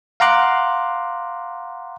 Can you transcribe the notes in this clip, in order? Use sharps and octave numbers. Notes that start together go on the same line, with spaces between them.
F5 F#5 A#5 C6 D6 F#6